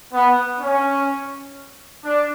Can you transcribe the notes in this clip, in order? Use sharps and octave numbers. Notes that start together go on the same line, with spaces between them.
B3
C#4
D4